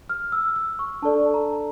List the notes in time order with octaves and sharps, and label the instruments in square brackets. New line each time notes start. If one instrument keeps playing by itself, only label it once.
[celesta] F6
E6
E6
C#6
D4 A4 D5 A5
A#5